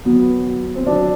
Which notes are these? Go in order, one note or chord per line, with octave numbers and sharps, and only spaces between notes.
F#3 B3
F#3
C4
F#3 D4